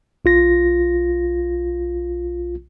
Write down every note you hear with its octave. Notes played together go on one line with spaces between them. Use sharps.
B1 F4 A#6